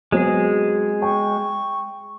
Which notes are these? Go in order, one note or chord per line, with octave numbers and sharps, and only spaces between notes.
F#3 G#3 B3 C4 G#4
G5 C#6